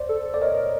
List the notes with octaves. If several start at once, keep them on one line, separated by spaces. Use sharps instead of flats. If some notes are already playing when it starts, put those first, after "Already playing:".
Already playing: C5 D5
A4
A4
D5
A#4 C#5 D#5